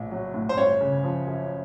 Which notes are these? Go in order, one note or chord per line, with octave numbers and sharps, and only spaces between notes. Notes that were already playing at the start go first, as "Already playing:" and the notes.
Already playing: A#1 A2
F#3
A2
C5
G1 C#5
C#3
F3
F#2